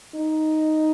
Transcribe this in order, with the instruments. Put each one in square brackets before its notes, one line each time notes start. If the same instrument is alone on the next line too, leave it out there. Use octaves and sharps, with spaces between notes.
[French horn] D#4